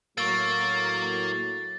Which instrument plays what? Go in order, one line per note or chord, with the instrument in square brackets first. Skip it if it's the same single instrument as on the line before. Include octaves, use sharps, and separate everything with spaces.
[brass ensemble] A2 F#3 [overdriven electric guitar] A#3 [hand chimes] C#6 E6 [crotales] A6